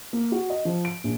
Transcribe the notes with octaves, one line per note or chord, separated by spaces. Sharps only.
A#3
F#4
D#5
F3
D7
A#1